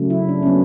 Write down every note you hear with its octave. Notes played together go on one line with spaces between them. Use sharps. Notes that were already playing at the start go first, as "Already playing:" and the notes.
Already playing: C#3 F#3 A3
E4
D4
C#4
F#3 A3 B3